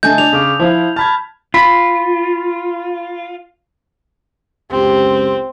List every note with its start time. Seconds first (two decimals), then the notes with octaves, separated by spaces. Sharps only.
0.03 D3 A3 D#5 G#5 A5 G6
0.18 D4 F7
0.32 C#3 D6
0.60 F3 E4 F5
0.96 A5 B5 F6 G#6
1.54 F4 B5 B6
4.71 C#2 F#2 C4 G4